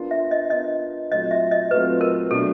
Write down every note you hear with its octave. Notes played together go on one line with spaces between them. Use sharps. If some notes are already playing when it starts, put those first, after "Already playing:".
Already playing: B3 D4 F4 A#4
E5
D#5
B3 D4 F4 A#4 D#5
A#2 F#3 A3 C4 F4 D#5
E5
D#5
A#2 F#3 A3 C4 F4 B4
A#4
B2 F#3 A3 D4 F#4 A4